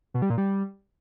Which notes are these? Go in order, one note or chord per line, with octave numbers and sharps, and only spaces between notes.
B2
G3
A#2
G3